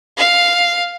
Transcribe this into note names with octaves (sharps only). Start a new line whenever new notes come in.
F5